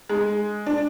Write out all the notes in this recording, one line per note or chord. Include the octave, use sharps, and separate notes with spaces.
G#3
D4